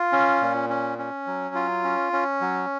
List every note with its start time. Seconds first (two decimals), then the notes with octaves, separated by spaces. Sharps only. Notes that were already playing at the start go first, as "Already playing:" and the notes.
Already playing: F4
0.12 C#4
0.41 A#2
0.70 C#4
0.98 C#4
1.27 F#3
1.55 F4
1.84 C#4
2.13 C#4
2.41 F#3